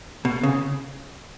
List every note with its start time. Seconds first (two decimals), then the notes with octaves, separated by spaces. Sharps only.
0.25 B2
0.43 C#3